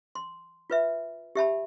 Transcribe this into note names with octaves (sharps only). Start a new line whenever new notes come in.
C6
F4 B4 E5
G4 E5 A5 B5